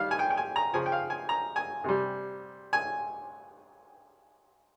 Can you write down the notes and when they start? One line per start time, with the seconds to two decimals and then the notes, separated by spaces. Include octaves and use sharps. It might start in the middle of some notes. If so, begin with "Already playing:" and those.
Already playing: D#3 G3 F5
0.11 G#5
0.19 G5
0.30 G5
0.37 G#5
0.56 A#5
0.74 C#3 F3 G#5
0.86 G5
0.92 F5
1.10 G#5
1.29 A#5
1.56 G#5
1.84 C3 G3
2.73 G#5